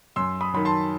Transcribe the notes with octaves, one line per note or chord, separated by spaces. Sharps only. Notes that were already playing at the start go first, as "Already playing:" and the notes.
F#2 C6 E6
B5 D#6
D#3 F#3 B5
A5 C6